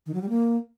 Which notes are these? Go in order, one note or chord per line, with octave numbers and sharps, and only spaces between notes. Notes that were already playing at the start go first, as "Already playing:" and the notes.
D#3
F#3
G3
A#3